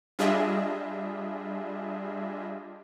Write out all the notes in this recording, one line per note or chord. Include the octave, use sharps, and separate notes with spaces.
G3 D4 F4 G#4 D#5 E5